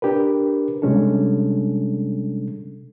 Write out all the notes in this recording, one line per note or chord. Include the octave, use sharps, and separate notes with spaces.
D4 G4 A#4 B4
C3 G3 G#3 C#4 D4 A4